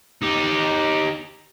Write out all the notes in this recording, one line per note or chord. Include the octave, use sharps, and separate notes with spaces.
D#4 G4